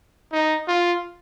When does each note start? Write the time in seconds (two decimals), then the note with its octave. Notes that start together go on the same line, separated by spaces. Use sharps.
0.33 D#4
0.68 F4